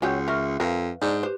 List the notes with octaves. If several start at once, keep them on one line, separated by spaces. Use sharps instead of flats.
C#2 F#3 C#4 G4 F#5 G6
A#4 E5 C#6 F6
F2 A#4 B4 F5
G#2 D4 G6
G4 B4 C5